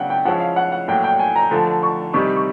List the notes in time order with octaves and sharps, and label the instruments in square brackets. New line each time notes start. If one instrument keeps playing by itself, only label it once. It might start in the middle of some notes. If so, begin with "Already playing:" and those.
Already playing: [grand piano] C#3 F#3 B3 D4 [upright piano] F#5 G5
[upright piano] G5
[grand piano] F3 G#3 C#4 E4 [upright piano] F#5
[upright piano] F5
F#5
F#5
[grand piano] A2 F#3 A#3 [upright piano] G5
[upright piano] G5
G#5
A#5
[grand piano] D3 F3 A3
[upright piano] C#6
[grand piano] C3 D#3 G3 [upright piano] C#6
[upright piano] C#6